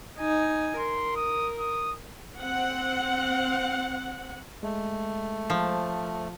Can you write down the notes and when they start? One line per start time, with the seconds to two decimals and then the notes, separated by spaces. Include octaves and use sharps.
0.18 D#4 G#5
0.78 A#4 C6
1.16 D#6
1.60 D#6
2.39 C4 F#5
4.63 G#3 A3
5.50 F3